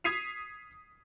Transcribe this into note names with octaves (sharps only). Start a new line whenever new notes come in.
D#6 G#6 B6 C7 D#7 F7